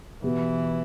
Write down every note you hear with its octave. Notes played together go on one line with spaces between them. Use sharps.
B2 E3 B3 G4